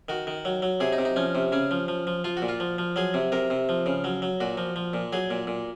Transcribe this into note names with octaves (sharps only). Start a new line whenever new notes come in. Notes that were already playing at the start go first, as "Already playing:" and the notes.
D#3 F#4
D#3
F#3
F#3
C3 G#4
D#4
C3
D#4
F3 C#4
C3
C#3 C#4
F3
F3
F3
F3 F4
F#4
A#2
F4
F3
F3
F#3 G#4
C3
C3 A#4
C3
F3
C#3
F#3
F#3
A#2 F#4
F3
F3
A#2
F#3 G#4
A#2
A#2